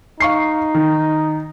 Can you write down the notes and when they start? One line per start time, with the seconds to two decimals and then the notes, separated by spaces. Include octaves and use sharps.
0.20 D#4 F5 C#6 C7
0.74 D#3